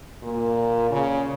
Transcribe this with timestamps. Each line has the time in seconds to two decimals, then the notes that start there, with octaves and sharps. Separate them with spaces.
0.23 A#2
0.91 C#3